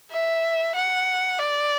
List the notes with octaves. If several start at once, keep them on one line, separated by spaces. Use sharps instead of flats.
E5
F#5
D5